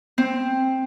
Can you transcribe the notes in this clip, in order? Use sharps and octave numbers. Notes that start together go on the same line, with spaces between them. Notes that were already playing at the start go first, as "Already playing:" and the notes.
C4